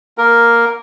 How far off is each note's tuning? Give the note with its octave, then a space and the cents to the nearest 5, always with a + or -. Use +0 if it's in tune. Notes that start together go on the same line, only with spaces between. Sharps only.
A#3 +0 A#4 +0